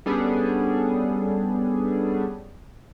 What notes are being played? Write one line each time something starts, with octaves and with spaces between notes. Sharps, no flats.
G3 B3 C#4 D4 G#4 A4